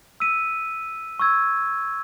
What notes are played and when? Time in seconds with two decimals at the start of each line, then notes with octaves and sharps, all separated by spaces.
0.20 E6 B6 D#7
1.19 C#6 E6 G#6